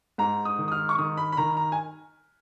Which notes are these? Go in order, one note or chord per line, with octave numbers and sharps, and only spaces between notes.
G#2 A#5
D#6
D#3
D#6
F6
C#6
D#3 D#6
B5
B5
D#3 A#5
A#5
G#5